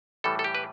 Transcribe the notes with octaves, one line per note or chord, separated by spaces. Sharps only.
A2 E3 G3 A4
A4
G4
B4